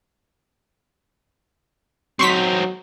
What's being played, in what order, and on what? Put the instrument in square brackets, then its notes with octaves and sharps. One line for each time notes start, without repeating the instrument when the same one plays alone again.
[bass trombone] F#3 [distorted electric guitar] C4 D#4 [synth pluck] C6 C#6 B6